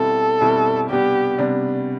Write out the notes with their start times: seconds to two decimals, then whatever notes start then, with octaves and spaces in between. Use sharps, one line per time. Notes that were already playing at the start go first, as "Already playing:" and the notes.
Already playing: B2 G3 C4 E4 A4
0.41 B2 G3 C4 E4
0.89 C3 G3 B3 D4 G4
1.38 C3 G3 B3 D4